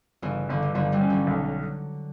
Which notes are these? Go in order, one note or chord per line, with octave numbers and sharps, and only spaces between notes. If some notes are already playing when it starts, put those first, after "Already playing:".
G1 C#3 E3
G1 D3
E3
G1 D3 F#3
E3 G3
C#4
D3 F#3
B1